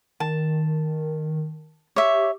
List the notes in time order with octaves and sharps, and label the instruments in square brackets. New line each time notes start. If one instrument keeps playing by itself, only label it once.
[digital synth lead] D#3 [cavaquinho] A5
[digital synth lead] G4 [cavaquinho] C#5 E5